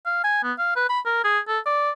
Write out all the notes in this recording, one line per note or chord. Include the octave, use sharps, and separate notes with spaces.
F5
G#5
B3
F5
B4
B5
A#4
G#4
A4
D5